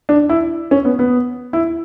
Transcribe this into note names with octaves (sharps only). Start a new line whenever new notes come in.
D4
E4
C#4
B3
B3
E4